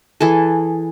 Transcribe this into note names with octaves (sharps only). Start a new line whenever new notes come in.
E3 G#4 A4